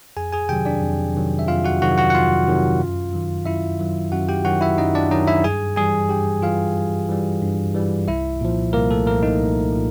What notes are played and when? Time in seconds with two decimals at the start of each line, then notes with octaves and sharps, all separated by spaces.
0.17 F2 G#4 G#5
0.32 G#4 G#5
0.49 C3 D#3 F#3 G4 G5
0.65 D4 D5
0.82 F2
1.15 C3 D#3 F#3
1.39 E5
1.48 F2 F4 F5
1.64 F#4 F#5
1.82 C3 D#3 F#3 F#4 F#5
1.98 F#4 F#5
2.10 F#5
2.14 F2 F4 F5
2.47 C3 D#3 F#3
2.81 F#2
3.13 D#3 F#3
3.46 F#2 E4 E5
3.79 D#3 F#3
4.12 F#2 F#4 F#5
4.29 G4 G5
4.45 D#3 F#3 F#4 F#5
4.61 E4 E5
4.78 F#2 D#4 D#5
4.95 D4 D5
5.11 D#3 F#3 D#4 D#5
5.27 E4 E5
5.44 G2 G#4 G#5
5.76 E3 G3 G#4 G#5
6.09 G2 G4 G5
6.42 E3 G3 F4 F5
6.76 G2
7.09 E3 G3
7.42 G2
7.74 E3 G3
8.08 C2 E4 E5
8.41 A#2 F3
8.73 C2 A#3 A#4
8.91 A3 A4
9.07 A#2 F3 A#3 A#4
9.23 D#4 D#5
9.39 C2
9.72 A#2 F3